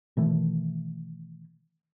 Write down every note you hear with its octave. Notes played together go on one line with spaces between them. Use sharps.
B2 D#3 E3 A3